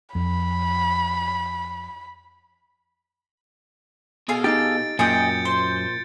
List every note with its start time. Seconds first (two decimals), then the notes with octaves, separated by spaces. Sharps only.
0.15 F2 B5
4.29 B2 G#4 A4 F5
4.44 D#4 G4 A6 D7
4.99 F#2 A#2 G#4 D#5 G5 G6 A6 C#7
5.45 C5